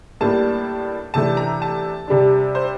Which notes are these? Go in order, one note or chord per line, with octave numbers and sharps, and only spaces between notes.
A2 G3 A#3 D4 A5
C3 E3 A3 D4 A5
A#5
A5
C3 G3 D4
C5